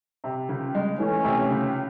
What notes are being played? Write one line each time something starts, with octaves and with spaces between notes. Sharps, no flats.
C3
C#2
G#3
E3 A3 C#4
C3
C#2